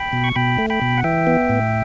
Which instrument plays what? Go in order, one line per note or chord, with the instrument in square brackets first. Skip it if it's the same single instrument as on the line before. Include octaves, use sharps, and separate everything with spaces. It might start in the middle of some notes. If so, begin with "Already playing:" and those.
Already playing: [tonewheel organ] G5 B5
B2
C#6
B2 G5 B5
A3
G5 B5
B2
F#5
E3 E5 G5
B3
A2